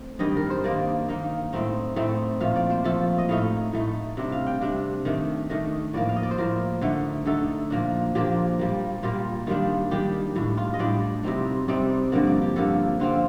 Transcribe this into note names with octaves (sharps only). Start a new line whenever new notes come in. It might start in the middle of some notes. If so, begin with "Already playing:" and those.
Already playing: A3 C4
G2 D#3 G3 D#5
A#4
C5
D#3 A#3 D#4 D5
D#3 A#3 D#4
A2 A3 C4 D#4
A2 A3 C4 D#4
A#2 F3 A3 F5
D5
C5
A#2 F3 A3 A4
D#5
A2 A3 D#4 F5
A2 A3 D#4
C3 G3 D4
F5
G5
C3 G3 D4
D#3 A3 D4
D#3 A3 D4 D#5
A2 F3 A#3 D5
F5
D#5
D5
C5
A2 F3 A#3 A#4
D3 A3 D#4
D3 A3 D#4 A4
A#2 F3 A#3 D4
A#2 F3 A#3 D4 G4
A#2 G3 A#3
A#2 G3 A#3 F4
D#3 G3 D4 F4
D#3 G3 D4 G4
A2 G3 D4
F4
D#5
A2 G3 D4 D5
C3 G3 C4 D#4
C3 G3 C4 D#4 D5
G2 D3 F3 A#3 D5
D5
G4
G2 D3 F3 A#3 A4
D3 F3 C4 F4